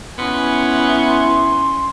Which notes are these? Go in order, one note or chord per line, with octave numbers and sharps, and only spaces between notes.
B3 C#4 E4 G#5 C6